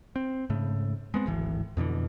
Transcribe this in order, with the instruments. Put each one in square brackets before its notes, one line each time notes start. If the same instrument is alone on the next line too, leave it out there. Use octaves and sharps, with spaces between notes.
[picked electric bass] C4
G#2 C#3 A3
G#3 B3 C4
D1 G#1 A2 E3
F2 B2 D3 E3